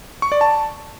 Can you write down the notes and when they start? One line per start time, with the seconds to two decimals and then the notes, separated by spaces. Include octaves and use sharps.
0.22 C#6
0.32 D5
0.41 A5